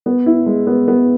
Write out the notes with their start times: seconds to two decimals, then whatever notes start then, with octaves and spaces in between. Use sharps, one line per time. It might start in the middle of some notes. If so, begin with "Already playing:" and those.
0.06 B3
0.26 E4
0.46 G#3
0.67 B3
0.88 B3